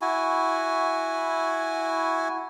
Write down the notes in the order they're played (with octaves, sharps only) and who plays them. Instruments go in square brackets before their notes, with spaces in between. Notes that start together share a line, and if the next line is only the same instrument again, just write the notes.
[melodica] E4 F#4 G#5